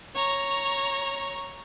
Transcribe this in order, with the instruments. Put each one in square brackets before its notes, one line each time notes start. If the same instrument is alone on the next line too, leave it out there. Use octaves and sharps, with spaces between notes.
[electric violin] C#5 A#5